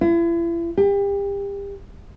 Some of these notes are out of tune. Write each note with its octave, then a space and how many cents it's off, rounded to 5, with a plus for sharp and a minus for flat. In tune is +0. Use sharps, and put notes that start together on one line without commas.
E4 +40
G4 +30